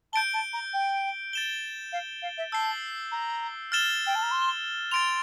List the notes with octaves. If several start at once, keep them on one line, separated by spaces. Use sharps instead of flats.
A5 G6 D7 G7
A5
A#5
G5
A6 E7 G7
F5
F5
E5
A5 E6 G6 C7 G7
A#5
F6 A6 E7 G7
G5
A5
A#5
C6
C6 A6 D7 F7